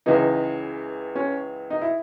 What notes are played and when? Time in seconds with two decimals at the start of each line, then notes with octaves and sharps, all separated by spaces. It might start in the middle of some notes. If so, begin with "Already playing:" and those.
0.06 C#2 C#3 E3 D#4
1.16 C#4
1.70 D#4
1.82 E4